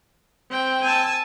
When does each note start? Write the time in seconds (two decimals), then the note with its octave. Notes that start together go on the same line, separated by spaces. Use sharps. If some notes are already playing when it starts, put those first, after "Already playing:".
0.50 C4 G5
0.83 G#5 A5 E6